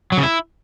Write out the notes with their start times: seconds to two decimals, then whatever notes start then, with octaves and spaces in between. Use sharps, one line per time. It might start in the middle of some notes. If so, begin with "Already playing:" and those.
0.12 F#3
0.18 C#3
0.23 E4